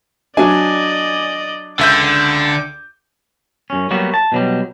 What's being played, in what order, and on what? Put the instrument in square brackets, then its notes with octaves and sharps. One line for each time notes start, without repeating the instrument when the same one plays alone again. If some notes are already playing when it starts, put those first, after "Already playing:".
[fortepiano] F#3 D4 [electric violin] D5 D#5 [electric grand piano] G#5
[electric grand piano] C#2 E5 G6 [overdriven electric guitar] D3 [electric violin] D6
[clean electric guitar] F#2 C#4
F#3 G3 A#3 B3 F#4
A5
B2 F#3 G3